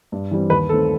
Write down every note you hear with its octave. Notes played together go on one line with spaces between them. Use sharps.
G2
E3 G3 C4
D#2 B4
D#3 A3 C4 A4